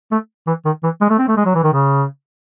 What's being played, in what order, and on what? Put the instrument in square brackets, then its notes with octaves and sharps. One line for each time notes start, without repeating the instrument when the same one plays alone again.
[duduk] A3
E3
D#3
E3
G#3
A3
C4
A3
G#3
F#3
E3
D#3
C#3